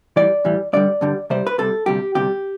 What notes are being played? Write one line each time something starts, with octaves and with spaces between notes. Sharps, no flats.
A2 E3 G3 D5
A2 E3 G3
G2 D3 G3 D5
G2 D3 G3
C2 C3 G3 C5
B4
C2 C3 G3 A4
D2 C3 G3 G4
D2 C3 G3 G4